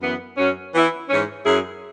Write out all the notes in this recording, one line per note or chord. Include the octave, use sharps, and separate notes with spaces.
F#2 E3 B3
F#2 F#3 C#4
E3 B3 E4
G#2 E3 C#4
F#2 F#3 E4 G#4